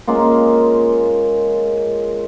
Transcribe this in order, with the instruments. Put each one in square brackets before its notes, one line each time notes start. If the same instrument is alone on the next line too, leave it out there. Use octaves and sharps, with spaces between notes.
[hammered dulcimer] G#3 A#3 C#4 F4